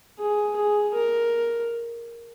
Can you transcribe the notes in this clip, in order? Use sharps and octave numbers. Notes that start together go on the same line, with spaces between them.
G#4
G#4
A#4